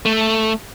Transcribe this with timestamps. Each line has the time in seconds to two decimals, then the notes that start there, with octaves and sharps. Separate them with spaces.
0.06 A3